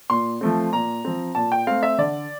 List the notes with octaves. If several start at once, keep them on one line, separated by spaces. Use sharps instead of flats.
A#2 C6
F3 A3 C4
A#2 A#5
F3 C4
A#2 A5
G5
A3 C4 F5
E5
D3 D5